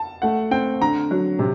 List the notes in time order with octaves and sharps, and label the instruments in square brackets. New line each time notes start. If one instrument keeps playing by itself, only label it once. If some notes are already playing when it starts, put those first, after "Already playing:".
Already playing: [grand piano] A5
[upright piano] A3 [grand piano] F#5
[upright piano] C4 [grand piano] G5
[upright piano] D3 [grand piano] A#5
[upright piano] F#3
C3